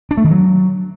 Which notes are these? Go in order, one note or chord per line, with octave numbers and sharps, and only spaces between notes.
D4
A3
D#3
F#3